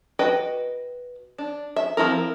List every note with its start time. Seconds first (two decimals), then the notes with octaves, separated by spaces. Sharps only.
0.19 F#4 B4 D#5 G5
1.38 D4
1.76 E5
1.97 F3 C4 E4 A#4